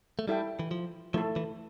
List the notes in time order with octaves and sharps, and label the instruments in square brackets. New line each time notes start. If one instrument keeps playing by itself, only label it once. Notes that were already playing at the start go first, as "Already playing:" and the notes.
[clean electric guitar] A3
[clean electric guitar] G3 [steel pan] E4 A4 E5 G5
[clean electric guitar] E3
F3
[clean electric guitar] F3 [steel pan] A3 E4 A4
[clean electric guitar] E3